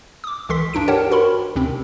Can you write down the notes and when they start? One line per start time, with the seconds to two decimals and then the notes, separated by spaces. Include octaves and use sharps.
0.24 D6 D#6
0.49 C#2 E3 A4 C6 B6
0.73 G2 D4 D#4 D7
0.88 G4 A#4 C#5 F#5 G5 A5
1.11 F#4 A#4 B5 C6
1.55 D2 C3 C4